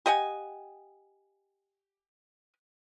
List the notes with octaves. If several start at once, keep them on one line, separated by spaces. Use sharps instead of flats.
G4 D#5 F#5 G#5